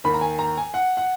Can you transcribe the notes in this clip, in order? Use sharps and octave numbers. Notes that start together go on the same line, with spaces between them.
D#2 D#3 B5
A#5
G#5
A#5
G#5
F#5
F#5